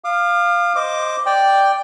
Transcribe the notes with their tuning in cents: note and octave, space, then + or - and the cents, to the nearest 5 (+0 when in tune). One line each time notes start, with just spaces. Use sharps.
F5 +0 D6 +45
C5 +0 D#5 +0 D6 +0
D5 +0 G5 +0